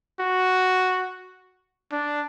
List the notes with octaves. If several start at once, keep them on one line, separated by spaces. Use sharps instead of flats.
F#4
D4